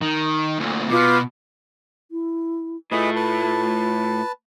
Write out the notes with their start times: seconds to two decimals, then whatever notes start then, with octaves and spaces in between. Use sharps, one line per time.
0.02 D#3
0.59 D2 A#2
0.89 B2 F4 B4 D6
2.11 E4
2.92 A2 A3 F4 G#4 B4 D#5
3.16 B4 A5